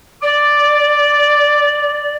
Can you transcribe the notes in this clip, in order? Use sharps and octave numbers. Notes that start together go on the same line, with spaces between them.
D5 D6